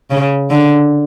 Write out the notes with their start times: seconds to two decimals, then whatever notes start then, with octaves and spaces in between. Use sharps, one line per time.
0.11 C#3
0.51 D3